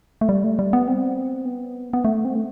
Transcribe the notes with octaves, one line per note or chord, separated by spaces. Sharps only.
A3
G3
A3
G3
B3
C4
B3
B3
A3
C4
A3